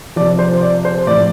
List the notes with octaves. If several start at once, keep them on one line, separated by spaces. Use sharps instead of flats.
C3 F3 D5
C5
D5
C5
A2 F3 D5